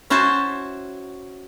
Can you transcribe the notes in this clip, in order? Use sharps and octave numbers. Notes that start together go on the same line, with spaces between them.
C#4 E4 F#4 C5 A5